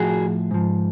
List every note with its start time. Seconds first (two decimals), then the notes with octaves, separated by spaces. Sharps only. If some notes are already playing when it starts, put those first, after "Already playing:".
Already playing: A2 F3 F#4 G#4
0.51 G#2 F3